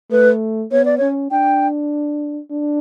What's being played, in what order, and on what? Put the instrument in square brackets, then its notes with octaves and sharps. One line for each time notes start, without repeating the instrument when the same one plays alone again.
[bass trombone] A3 [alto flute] B4
[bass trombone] B3 [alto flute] C#5
[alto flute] D5
[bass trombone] C#4 [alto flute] C#5
[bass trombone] D4 [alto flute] G5
[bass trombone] D4